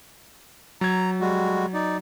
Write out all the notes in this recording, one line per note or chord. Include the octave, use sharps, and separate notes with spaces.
F#3 A#5 G#6
G3 G#3 F#4
D#4 D5